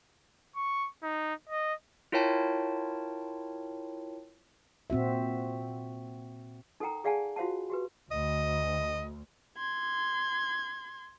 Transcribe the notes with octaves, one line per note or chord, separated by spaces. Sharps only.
C#6
D#4
D#5
E4 F4 A#4 C#5 G5 A5
A#2 C4 F#4 E5
D#4 A4 A#4 F#5 G5 A#5
G#4 D5 F5 F#5 G#5 A5
F4 F#4 C5 F5 F#5 A5
F#4 G4 B4
D2 D#5
C6 G#6